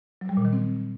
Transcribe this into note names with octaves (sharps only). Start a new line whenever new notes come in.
F#3
G3
A#2
D#3
C4